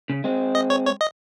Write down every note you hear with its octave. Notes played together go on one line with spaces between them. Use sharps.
C#3
G#3 C4
D#5
C#5
C#5
D#5